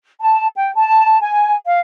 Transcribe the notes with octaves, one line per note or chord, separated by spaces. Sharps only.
A5
G5
A5
G#5
F5